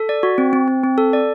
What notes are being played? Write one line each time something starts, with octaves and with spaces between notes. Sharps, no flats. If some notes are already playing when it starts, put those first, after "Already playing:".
Already playing: A4
D5
F#4
C4
C4
C4
C4
A4
D5